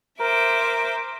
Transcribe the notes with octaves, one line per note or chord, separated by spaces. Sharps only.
A#4 C5 E5 D6